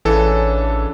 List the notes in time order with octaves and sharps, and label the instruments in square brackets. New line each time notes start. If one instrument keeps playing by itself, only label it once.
[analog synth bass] A1 [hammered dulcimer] C#3 D4 [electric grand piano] E3 A4